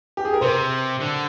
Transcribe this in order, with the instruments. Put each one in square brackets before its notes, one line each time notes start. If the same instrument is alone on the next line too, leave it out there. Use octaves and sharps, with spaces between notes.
[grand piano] G4
G#4
A#4
[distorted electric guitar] C3 [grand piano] C5
[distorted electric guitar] D3